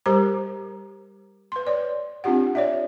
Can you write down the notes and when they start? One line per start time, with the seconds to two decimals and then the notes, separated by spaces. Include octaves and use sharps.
0.06 G3 G4 A#4 C5 A#5 D6
1.52 B4 C6
1.67 C#5 D5
2.24 C4 D4 F4 G4 F#5
2.55 C#5 D5 E5